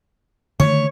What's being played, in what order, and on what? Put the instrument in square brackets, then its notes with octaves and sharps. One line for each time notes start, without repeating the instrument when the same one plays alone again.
[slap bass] D3 D#3 A3 [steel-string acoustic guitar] C#5